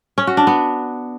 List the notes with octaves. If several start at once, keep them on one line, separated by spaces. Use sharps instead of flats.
C#4
F#4
D4
B3